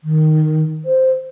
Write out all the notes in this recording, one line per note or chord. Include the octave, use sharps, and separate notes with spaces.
D#3
C5